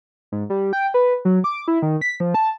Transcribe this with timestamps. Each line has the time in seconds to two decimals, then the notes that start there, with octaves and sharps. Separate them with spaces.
0.32 G#2
0.50 G3
0.73 G5
0.94 B4
1.25 F#3
1.44 D6
1.68 E4
1.82 D#3
2.01 B6
2.20 F3
2.34 A5